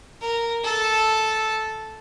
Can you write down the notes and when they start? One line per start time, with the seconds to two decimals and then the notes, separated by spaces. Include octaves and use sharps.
0.21 A#4
0.63 A4